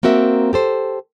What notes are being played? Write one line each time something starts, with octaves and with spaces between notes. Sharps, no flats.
A#3 C4 F#4 A#4 E5
G4 A4 C5